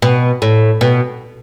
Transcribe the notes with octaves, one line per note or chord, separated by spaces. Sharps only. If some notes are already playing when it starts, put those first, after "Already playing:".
B2
A2
B2